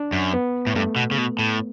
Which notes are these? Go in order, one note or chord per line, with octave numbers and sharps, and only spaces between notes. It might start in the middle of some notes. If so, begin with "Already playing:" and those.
Already playing: D4
F#2
B3
A2
G2 A3
B2
C#3
B2
A2